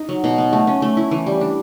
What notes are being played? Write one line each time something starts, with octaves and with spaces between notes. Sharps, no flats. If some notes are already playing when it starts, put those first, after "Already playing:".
Already playing: D#4
F#3
B2
B3
A3
C#4
A3
E4
E3
G3
D4